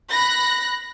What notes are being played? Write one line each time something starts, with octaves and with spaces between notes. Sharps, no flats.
B5 F#6 A#6